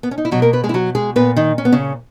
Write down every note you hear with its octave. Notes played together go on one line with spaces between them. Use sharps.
B3
C#4
D#4
E4
B2 F#3 F#4
A#3 A#4
B3 B4
G#3 G#4
E4
F#3 F#4
G#3 G#4
A#2 B3 B4
D#3 D#4
C#4
B3
C#3 C#4